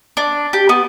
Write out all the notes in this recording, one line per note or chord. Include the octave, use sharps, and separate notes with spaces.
D4
G4
B3